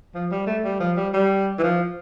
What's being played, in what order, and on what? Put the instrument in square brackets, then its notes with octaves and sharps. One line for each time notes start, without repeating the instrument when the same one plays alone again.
[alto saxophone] F3
G3
A3
G3
F3
G3
G3
E3
F3